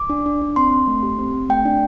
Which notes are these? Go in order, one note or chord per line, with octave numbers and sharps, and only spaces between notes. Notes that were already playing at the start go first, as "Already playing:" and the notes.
Already playing: D6
D4
D4
D4
C4 C6
C4
A3
G4
C4
C4
A3 G5
D4